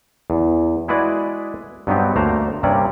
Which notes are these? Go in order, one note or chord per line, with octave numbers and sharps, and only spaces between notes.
E2
G#3 E4 F#4 G#4 B4 D5
G2 F#3 B3 C4 D#4 G4
D2 A3 A#3 C5 G5 A#5
G2 C3 A#3 C4 C#4 D5